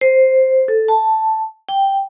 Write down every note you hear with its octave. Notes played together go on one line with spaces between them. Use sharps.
C5
A4
A5
G5